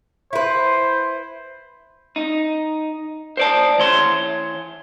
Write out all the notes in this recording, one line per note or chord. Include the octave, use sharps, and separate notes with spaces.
E4 B4 C5
D#4
C5 D5 A5
E3 C#5 C6